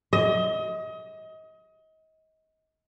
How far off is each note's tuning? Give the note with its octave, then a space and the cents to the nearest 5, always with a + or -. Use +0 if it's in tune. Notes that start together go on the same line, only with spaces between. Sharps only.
D#5 +30